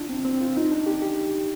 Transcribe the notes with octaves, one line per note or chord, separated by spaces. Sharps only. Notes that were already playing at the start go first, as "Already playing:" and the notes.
Already playing: D4 F4
C4
C4
F4
D#4
D4
G4
G4